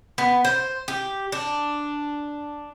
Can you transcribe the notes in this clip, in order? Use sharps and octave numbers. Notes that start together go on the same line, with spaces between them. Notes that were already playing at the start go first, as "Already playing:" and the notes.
B3
C5
G4
D4